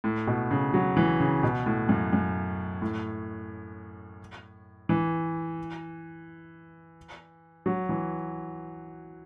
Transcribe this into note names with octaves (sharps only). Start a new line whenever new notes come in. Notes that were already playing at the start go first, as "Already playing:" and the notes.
A2
B2
C#3
F#3
E3
C#3
B2
A2
F#2
F#2
A2
E3
F#3
E3